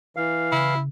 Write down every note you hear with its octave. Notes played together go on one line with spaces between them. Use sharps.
E3 F5
C#3 E4